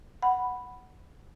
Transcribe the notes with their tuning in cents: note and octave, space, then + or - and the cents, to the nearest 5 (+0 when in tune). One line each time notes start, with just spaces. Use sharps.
F#5 +0 B5 +0